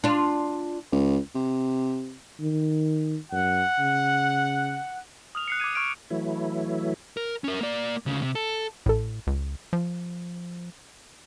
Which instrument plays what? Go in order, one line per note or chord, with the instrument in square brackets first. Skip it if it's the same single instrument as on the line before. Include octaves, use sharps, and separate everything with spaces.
[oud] D4 F4
[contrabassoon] C#2
C3
[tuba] D#3
[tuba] F#2 [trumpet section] F#5
[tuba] C#3
[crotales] D#6 F6 F7
F#6 C7 C#7
D6 F#6 G#6 D#7
C#6 F6 G#6 D7
[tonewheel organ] E3 F#3 A3 E4
[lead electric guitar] A#4
C#4 A#4
A#3 D5
D2 C#3
C3
A4
[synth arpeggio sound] A1 A4 [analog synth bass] A2
[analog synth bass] C#2
F3